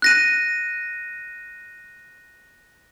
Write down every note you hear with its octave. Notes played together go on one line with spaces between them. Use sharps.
F#6 A#6 D#7